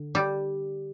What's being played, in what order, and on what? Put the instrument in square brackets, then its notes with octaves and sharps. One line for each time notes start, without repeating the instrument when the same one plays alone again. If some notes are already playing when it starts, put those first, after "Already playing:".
Already playing: [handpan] D3
[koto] G3